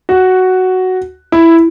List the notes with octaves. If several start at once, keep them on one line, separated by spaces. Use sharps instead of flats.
F#4
E4